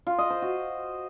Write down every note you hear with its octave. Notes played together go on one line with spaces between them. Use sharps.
F4
D#5
C5
F#4